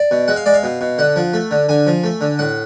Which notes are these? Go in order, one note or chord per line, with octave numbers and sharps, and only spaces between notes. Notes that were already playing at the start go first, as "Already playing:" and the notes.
Already playing: D5
B2
G#3 F#5
F5
G#3 D5
F5
B2
B2
D3 F#5
F3
A3
D3
D3 G#5
F3
A3
D3
A2 F#5